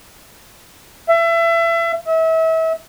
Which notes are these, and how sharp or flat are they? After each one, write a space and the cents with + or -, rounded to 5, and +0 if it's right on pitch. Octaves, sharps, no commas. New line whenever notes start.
E5 +30
E5 -35